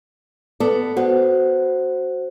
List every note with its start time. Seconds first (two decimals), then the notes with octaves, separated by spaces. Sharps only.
0.60 B3 A4 D5
0.97 B3 F#4 C5 F#5